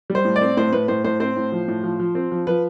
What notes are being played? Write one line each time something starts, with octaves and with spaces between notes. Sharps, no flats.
G3
C5
A2
D5
C4
A2 C5
A2 B4
A2 C5
A2 C5
C4 C5
A2
F3
A2
F3
F3
C4
F3
F3 B4